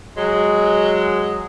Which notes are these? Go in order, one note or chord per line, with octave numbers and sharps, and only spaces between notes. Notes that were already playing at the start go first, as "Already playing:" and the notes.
F#3 G#3